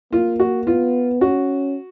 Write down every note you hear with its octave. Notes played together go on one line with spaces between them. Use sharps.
A#3 F4
F#4
B3 F4
C#4 F#4